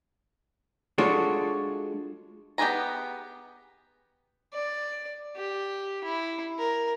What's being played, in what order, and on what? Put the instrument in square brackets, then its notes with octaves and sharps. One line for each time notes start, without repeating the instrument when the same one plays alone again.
[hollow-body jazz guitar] G#3 D4 F4 F#4 A4 C#5
[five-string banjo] B3 G4 G#4 G#5 A#5
[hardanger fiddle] D5
G4
E4
A#4